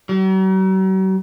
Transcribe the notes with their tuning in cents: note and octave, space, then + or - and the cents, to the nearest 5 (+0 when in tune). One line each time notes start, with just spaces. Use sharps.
F#3 +45